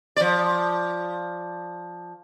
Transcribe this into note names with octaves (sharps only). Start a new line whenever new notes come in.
F3 D5